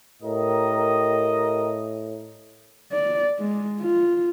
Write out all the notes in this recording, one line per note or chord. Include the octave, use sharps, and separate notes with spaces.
A2 G4 A#4 D#5
D5
G#3
F4